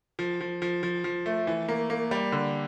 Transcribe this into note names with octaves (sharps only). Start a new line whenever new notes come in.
F3
F3
F3
F3
F3
A3
E3
A#3
A#3
G3
D3